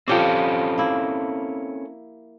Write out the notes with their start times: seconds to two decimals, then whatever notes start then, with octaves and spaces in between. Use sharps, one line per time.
0.08 F3 C4 C#4 G4 A4 D5
0.78 A#3 E4